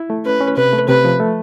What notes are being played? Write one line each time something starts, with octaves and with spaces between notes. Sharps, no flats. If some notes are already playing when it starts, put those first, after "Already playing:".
Already playing: E4
A3
C#4 B4
C#4
C3 B4
A3
C3 B4
F3
A3